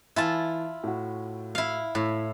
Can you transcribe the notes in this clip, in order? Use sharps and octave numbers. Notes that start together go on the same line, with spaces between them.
E3 E4 F4 A5
A2 F#4
E4 F5
A2 E4